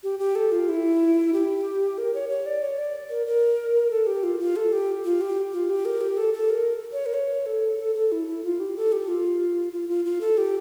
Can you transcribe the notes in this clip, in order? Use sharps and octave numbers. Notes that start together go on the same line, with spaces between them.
G4
G4
A4
F4
E4
G4
A#4
C#5
C#5
D5
C#5
D5
A#4
A#4
A4
G4
F4
F4
A4
G4
F4
G4
F4
G4
A#4
G4
A4
A4
A#4
C#5
A#4
C#5
A4
A4
A4
E4
E4
F4
G4
A4
G4
F4
F4
F4
F4
A4
G4